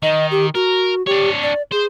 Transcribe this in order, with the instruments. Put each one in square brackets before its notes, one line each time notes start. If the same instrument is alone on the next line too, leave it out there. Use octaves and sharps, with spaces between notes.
[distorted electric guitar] D#3 [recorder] D#5
[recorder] G4
[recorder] F#4 [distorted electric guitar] A#4
[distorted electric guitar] D4 C#5 [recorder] G4
[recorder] D5
[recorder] G#4 [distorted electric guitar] C5